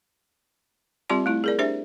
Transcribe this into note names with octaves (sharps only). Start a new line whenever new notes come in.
G3 C4 F4 G4 D5 C6
A3 E4
G#4 A#4 D5
D4 G4 C5 E5